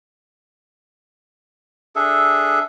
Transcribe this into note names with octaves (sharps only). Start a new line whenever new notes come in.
D4 G#4 A4 E5